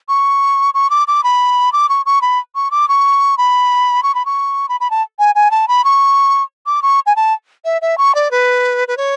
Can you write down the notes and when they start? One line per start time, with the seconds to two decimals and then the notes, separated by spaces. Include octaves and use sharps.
0.09 C#6
0.74 C#6
0.90 D6
1.08 D6
1.24 B5
1.73 D6
1.89 C#6
2.06 C#6
2.22 B5
2.55 C#6
2.71 D6
2.89 C#6
3.38 B5
4.03 C#6
4.15 B5
4.26 C#6
4.69 B5
4.81 B5
4.91 A5
5.19 G#5
5.35 G#5
5.51 A5
5.68 B5
5.84 C#6
6.66 D6
6.83 C#6
7.06 G#5
7.16 A5
7.65 E5
7.82 E5
7.98 C#6
8.15 D5
8.31 B4
8.88 B4
8.97 C#5